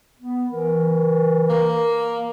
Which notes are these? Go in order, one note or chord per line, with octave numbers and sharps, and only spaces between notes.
B3
E3 A#4
A#3